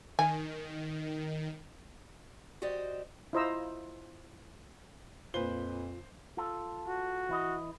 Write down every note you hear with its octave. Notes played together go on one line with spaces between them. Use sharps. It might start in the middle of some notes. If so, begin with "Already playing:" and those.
D#3 G#5
F#4 G4 C5 D5 D#5
E4 F4 C5 D#5 A#5 E6
F2 A#2 F4 B4 C5 G7
F4 A4
F#4
E3 E4 D#5